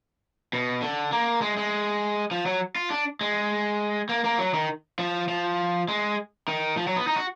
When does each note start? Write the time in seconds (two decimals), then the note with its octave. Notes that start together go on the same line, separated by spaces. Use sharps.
0.53 B2
0.82 D3
1.12 A#3
1.42 G#3
1.57 G#3
2.31 F3
2.46 F#3
2.76 F4
2.90 D4
3.21 G#3
4.09 A#3
4.24 A#3
4.39 F#3
4.54 D#3
4.99 F3
5.28 F3
5.88 G#3
6.48 D#3
6.77 F3
6.87 F#3
6.97 B3
7.07 D#4
7.16 F#4